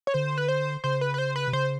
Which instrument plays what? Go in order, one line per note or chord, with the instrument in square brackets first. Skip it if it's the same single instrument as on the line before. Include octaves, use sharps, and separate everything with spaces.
[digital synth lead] C#5
[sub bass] D3 [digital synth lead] C5
[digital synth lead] B4
C5
[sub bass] C#3 [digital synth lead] C5
[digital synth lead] B4
B4
C5
B4
[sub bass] C3
[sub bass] C#3 [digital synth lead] C5